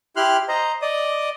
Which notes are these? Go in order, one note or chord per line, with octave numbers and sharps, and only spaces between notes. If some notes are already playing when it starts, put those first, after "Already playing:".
E4 G4 C6 F6 F#6
C5 D#5 A#5
D5 D#5 D#6